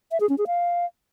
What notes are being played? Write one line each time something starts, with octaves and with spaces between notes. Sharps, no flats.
E5
G#4
C#4
G#4
F5